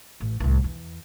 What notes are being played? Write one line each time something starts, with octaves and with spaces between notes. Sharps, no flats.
A1
C2 A2
E2